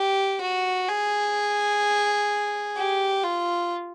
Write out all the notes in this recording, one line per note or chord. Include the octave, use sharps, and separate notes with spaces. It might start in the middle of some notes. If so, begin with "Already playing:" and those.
Already playing: G4
F#4
G#4
G4
F4